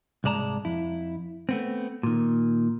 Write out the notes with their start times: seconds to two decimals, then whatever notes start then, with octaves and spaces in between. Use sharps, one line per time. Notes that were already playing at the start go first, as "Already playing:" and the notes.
0.24 C2 G#2 G#3 D5 A5 A#5
0.65 F2 E4
1.49 A3 B3 C4
2.03 A#2 D#3